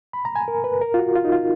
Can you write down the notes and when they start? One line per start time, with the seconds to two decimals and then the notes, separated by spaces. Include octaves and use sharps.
0.13 B5
0.25 A#5
0.36 G#5
0.48 A#4
0.64 B4
0.81 A#4
0.94 F4
0.99 F#4
1.16 F4
1.24 D#4
1.32 F4